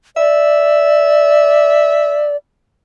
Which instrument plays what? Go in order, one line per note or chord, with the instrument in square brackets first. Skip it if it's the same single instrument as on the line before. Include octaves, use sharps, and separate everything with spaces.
[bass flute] D5 [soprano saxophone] E5